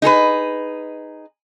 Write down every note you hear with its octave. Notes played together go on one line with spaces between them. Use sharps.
D#4 G#4 A4 B4